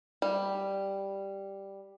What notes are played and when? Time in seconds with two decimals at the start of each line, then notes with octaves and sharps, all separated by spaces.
0.22 G3